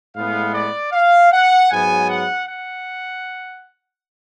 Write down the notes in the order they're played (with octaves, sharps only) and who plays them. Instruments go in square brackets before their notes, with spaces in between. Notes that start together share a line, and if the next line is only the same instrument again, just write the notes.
[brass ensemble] A2 G#3 B3 F5
D5
F5
F#5
G#2 F#3 B3 G#5
F#5
F#5